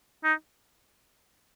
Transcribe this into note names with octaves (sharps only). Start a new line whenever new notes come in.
D#4